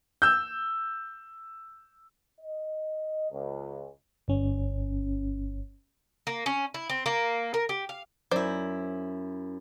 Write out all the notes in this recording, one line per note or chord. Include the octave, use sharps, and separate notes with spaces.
E6 G6
D#5
C#2
G1 C#4
A#3
C#4
E4
C4
A#3
A#4
G4
F5
F#2 E4 C5 D5